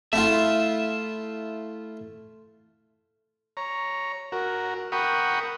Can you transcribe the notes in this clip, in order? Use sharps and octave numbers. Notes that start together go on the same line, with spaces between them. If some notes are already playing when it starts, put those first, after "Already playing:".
A3 E4 F4 E5
C#5 A#5
F#4 A#4
A#4 F#5 G5 B5 C#6 D#6